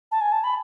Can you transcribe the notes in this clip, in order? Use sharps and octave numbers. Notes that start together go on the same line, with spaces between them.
A5
G#5
A5
B5